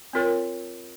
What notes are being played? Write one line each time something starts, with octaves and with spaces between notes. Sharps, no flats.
C4 F4 A#4 C#5